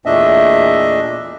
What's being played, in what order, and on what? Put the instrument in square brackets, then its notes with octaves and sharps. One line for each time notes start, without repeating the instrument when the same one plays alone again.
[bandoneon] E2 A#2 A3 D4 D#5 E5